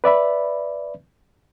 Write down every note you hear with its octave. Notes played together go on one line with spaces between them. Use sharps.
B4 D5 E5 B5